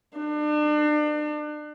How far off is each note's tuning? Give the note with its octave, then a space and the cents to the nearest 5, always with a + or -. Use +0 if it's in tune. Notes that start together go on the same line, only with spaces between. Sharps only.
D4 +35